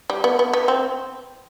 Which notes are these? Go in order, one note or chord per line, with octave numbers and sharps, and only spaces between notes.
G3
B3
B3
B3
C4